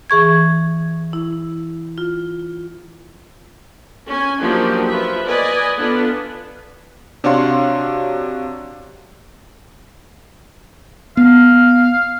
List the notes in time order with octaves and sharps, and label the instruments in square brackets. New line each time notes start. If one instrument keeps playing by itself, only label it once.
[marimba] E3 G#4 C#6 G#6
E4
F4
[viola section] C#4 G#5
F3 F#3 A#3 D4 D#4 G4
F3 F4 B4 E5
B4 D5 D#5 G#5
B3 D4 F4 A4 B4
[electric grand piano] C3 D4 F#4 C#5 F5 C6
[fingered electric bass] B3 [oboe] F5